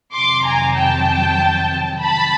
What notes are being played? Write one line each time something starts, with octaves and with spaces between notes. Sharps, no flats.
F2 C3 D#3 F#3 C6 D6
G#5 A#5
G5 A5
A5 B5